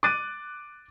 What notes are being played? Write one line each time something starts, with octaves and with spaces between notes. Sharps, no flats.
D6 F#6 A6 D#7